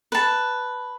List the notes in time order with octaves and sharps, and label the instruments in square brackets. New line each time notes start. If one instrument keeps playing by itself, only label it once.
[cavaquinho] B4 A5